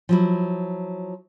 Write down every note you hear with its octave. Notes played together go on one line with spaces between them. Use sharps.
F3 F#3 E4